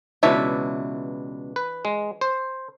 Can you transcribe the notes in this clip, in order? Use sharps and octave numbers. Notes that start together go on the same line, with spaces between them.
C#2 B2 E3 D4 C#5 E5
B4
G#3
C5